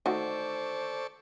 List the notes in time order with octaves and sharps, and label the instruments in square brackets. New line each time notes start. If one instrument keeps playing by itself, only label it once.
[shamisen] D#3 A3 F#4 [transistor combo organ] A4 D5 C#6 [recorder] C5